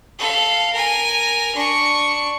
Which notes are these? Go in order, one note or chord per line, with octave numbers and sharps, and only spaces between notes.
A4 F5
A#4 G#5
D4 C#6